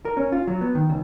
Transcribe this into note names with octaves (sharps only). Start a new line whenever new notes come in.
A#4
C#4
F4
F#3
B3
D#3
C#2